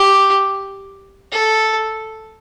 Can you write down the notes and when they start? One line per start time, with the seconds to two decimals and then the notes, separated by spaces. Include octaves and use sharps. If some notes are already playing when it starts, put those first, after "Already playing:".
Already playing: G4
1.32 A4